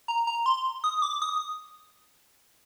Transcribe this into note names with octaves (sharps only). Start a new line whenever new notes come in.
A#5
A#5
C6
D#6
D6
D#6